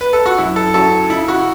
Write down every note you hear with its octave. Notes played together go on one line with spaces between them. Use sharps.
B4
A4
F#4
F#2 E4
A4
F#3 C#4 E4 A4
C#3 E4
F#4